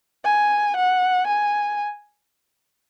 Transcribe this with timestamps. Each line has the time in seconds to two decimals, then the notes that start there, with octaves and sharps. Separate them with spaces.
0.25 G#5
0.76 F#5
1.27 G#5